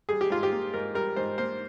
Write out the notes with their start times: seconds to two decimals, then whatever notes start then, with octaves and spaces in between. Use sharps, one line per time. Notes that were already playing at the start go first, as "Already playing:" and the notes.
0.09 G3 G#4
0.21 G4
0.30 G#2 F4
0.43 G4
0.52 A#3
0.74 G#2 A#4
0.95 G3 A#4
1.16 G#2 C5
1.38 A#3 C5